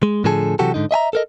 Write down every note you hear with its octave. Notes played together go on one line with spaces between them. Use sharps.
G#3
A2 D3 F3 G#4 A4
C3 E3 F#3 F#4 G4 A4
G#2 D3 D#4
D#5 E5 G#5 A#5
A4 A#4 D#5